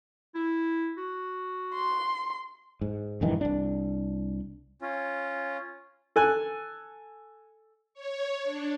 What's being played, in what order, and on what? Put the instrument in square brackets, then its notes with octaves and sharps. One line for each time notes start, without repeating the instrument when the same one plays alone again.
[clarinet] E4
F#4
[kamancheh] C6
[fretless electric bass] G#2
A#1 G2 D#3 E3
C2 D4
[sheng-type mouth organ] C#4 F4
[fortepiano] A4 G#5 F#6
[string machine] C#5
D4